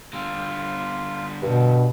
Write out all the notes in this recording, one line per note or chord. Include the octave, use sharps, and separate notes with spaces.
D3 G3 F4
G2 B2